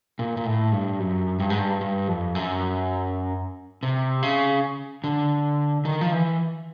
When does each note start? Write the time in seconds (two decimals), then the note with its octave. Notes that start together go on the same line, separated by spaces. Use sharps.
0.19 A#2
0.37 A#2
0.45 A2
0.72 G2
0.99 F#2
1.40 G2
1.50 G#2
1.59 G2
1.81 G2
2.08 F2
2.35 F#2
3.83 C3
4.22 C#3
5.04 D3
5.85 D#3
6.01 F3
6.12 E3